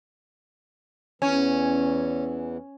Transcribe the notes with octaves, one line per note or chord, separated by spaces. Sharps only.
E2 E3 C#4